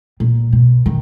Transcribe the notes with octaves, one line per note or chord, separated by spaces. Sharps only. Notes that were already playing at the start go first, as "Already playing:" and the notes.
A#2
B2
D#3